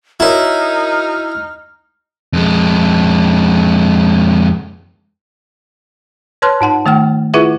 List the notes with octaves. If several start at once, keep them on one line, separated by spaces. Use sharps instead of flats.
D#4 E4 F#4 A#4 C#5 F6
F2 G#3
B4 C#5 A5 C6 F6 F#6
G#2 D#4 F#5 A5
D#3 A3 G5 F6
E4 F4 G#4 B4 E5 F#5